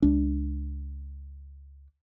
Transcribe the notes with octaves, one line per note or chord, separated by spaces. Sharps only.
C#2 D4